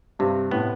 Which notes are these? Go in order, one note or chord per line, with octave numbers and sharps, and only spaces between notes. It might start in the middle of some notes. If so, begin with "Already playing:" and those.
G2 C3
A2 B3